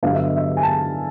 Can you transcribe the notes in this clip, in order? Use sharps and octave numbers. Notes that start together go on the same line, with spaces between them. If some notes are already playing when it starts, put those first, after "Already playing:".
G2 D3 F#3 B3 F5
E5
D#5
E5
G#5
A5